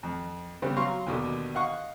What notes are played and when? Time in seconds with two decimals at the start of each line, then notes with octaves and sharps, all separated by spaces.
0.03 F2
0.62 C#3 G3 B3 C4
0.76 F#3 F5 A#5 C6 C#6
1.07 D#2 B2 D3
1.54 D#5 F5 F#5 C#6